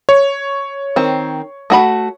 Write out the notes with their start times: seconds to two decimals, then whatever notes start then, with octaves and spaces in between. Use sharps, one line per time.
0.09 C#5
0.96 D#3 C4
1.70 A3 F#4 B5